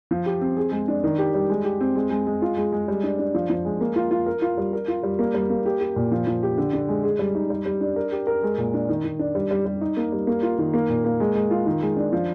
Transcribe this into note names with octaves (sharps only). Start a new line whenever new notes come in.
F3
G4
C4
G#4
G#3
D4
D#3
G4
G3
G#3
G4
C4
G#3
G#3
G#3
F4
G#3
G#3
G3
D4
D4
F3
F3
G#3
A#3
F4
F4
A#4
F4
G3
A#4
F4
G3
A#3
G3
A#3
G4
G4
A#2
F3
F3
G4
D3
D3
G#3
G#4
G3
D#4
G3
G3
D4
A#4
G4
A#4
G#3
A#2
D4
D#3
D#3
D4
G3
G3
G3
D#4
A#3
G3
A#3
F4
D#3
A#3
A#2
A#3
G#3
G#3
F4
D#3
G#3
D4
F3